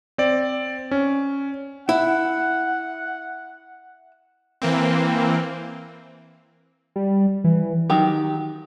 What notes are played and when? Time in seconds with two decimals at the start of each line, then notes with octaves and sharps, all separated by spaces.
0.18 C4 D5
0.91 C#4
1.89 E4 F#5
4.62 E3 A#3 C4
6.96 G3
7.44 E3
7.90 D#3 F#3 G4